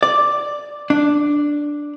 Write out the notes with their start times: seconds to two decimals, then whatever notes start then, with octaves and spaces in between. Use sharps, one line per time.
0.03 D5
0.90 D4